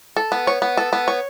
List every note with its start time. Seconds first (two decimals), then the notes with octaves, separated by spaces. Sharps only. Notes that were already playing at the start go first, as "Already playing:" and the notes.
0.17 A4
0.32 B3
0.47 C#5
0.62 B3
0.77 A4
0.93 B3
1.08 C#5